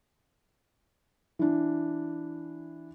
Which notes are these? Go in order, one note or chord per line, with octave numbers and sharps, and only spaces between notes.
E3 D4